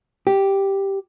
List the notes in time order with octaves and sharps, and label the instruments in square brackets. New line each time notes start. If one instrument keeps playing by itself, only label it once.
[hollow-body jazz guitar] G4